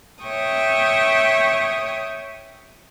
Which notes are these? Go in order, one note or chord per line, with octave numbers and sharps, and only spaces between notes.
C#5 E5 G5 C#6 D#6